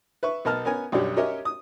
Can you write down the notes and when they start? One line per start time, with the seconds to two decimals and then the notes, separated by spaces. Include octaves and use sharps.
0.23 B4 E5 C#6
0.45 B1 B3 A#4 D#5 A5 F6
0.65 B3 C#4 A#4 G#5
0.92 B1 F#2 G3 D4 G4 C#5
1.16 C#4 G4 A#4 C#5 D#5 E5
1.45 D#6